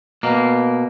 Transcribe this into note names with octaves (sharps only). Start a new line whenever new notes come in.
B2 A#3